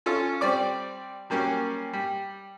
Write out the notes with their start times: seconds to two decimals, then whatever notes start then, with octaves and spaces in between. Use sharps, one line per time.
0.06 C#4 F4 A4
0.41 G3 C4 D5 D6
1.30 F#3 G3 A#3 C#4
1.93 G3